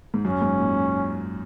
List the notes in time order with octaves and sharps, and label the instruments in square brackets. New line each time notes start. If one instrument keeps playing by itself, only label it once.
[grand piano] G#2
[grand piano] F#2 [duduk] C#4
[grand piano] G#2
A#2